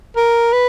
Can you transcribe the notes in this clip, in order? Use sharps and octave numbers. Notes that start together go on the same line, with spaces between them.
A#4
B4